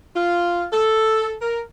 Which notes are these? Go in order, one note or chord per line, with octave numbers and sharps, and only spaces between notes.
F4
A4
A#4